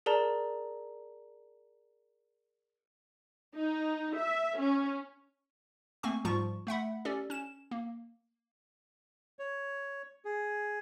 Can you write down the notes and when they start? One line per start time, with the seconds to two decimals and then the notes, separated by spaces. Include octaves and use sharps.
0.06 G#4 A#4 D5 A5 A#5
3.56 D#4
4.16 E5
4.59 C#4
6.03 A3 A#3 C4 G#5 C#6
6.25 G#2 F3 G3 F4 A5 C#6
6.67 A3 E5 F#5 B5
7.05 C#4 G4 A4 D5
7.30 C#4 E7
7.71 A#3
9.39 C#5
10.25 G#4